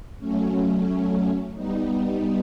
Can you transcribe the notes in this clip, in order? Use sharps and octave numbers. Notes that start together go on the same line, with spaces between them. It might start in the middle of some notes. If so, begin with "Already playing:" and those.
F#3 A3 C#4
G3 B3 D#4